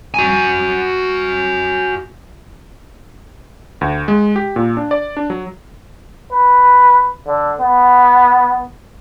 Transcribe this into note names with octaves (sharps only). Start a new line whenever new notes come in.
F#4 G#5
D2
G#3
G4
A#2
D4
D5
D4
F#3
B4
D3
B3